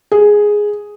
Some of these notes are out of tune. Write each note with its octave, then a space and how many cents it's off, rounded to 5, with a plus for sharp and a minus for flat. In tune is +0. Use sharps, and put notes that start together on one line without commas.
G#4 +0